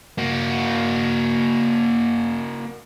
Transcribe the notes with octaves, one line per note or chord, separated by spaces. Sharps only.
A#3 F#4